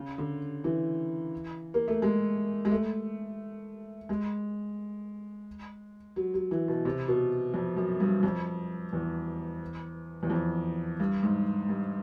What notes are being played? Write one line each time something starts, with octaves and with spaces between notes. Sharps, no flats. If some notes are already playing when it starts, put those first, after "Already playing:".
Already playing: C#3
D3
E3
A#3
A3
G#3
G#3
A3
G#3
F#3
F#3
E3
B2
C3
B2
F2
F#2
G2
F2
E2
E2
F2
G2
G#2
G2